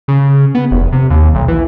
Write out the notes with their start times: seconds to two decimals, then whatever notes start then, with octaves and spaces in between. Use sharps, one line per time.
0.08 C#3
0.55 B3
0.71 F1
0.93 C3
1.10 D#2
1.35 B1
1.48 E3